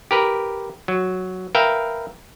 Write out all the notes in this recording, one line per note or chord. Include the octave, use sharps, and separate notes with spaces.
G4 A#4 B4
F#3
A#4 B4 E5 F5 G5